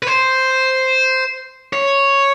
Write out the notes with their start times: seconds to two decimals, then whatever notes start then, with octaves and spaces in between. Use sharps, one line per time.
0.03 B4
0.07 C5
1.73 C#5